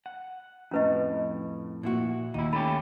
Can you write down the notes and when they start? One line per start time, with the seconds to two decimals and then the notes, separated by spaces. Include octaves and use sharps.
0.06 F#5
0.71 F2 A2 C#4 B4 D#5
1.83 A#2 E4 F#4
2.34 D#2 D#4 E4
2.53 A3 C#4 G4 B5